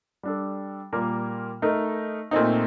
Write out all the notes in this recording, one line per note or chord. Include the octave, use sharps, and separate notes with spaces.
G3 D4 A4
A#2 G3 A#3 F4 A#4
A3 D#4 A#4
A#2 A3 C4 D#4